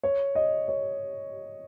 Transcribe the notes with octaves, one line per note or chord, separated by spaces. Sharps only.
C#5
D#5
C#5